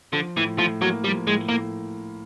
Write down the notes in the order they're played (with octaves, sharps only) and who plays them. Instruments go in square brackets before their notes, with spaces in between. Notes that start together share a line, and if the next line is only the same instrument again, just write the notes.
[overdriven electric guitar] D3 [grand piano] F3
[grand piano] A2 [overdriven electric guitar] E3
[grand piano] A2 [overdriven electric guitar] F3
[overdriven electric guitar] F#3 [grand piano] A#3
[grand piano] F3 [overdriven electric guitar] G3
[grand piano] A2 [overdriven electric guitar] G#3
[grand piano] A2 [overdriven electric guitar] A#3